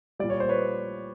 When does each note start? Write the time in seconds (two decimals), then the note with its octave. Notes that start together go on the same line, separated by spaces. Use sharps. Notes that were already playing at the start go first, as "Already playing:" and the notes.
0.19 A#2 G3 D5
0.30 C#5
0.40 C5
0.49 B4 C#5